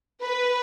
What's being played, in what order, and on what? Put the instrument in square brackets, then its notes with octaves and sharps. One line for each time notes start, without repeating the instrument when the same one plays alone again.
[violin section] B4